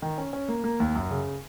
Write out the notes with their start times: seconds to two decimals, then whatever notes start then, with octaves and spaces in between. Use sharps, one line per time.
0.02 D#3
0.18 C#4
0.33 C#4
0.49 A#3
0.64 A#3
0.80 D#2
0.95 F#2
1.11 C#3